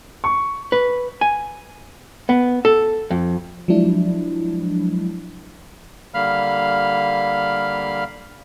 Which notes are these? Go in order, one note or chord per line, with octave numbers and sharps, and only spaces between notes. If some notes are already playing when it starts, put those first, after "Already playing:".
C#6
B4
G#5
B3
A4
F2
F3 F#3 G#3 D4 E4
D3 G3 A#3 F5 B5 F6